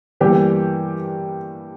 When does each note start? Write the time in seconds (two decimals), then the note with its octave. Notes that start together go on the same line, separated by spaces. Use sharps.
0.21 G2 E3 G3 A#3 G4